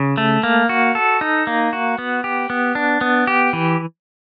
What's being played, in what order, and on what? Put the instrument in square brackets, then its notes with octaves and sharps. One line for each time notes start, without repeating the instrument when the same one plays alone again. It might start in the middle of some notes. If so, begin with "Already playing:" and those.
Already playing: [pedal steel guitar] C#3
A3
A#3
F#4
A4
D#4
A#3
F#4
B3
G4
B3
D4
B3
G4
E3